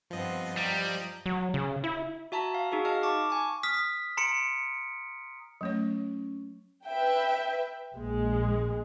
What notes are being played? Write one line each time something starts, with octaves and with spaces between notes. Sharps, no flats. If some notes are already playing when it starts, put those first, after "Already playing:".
G2 F3 B3 C4 D#5
G3 A#5
F#3
C#3
E4
F#4 E5 A5 A#5
F5
D#4 F#4 G#4
D#5 F5 A5 F6
A5 C#6 D6
G#5 C#6
D#6 F6 B6
A#5 C6 C#7 D7
F#3 A3 C#4 C#5
B4 E5 G5
A#1 G#3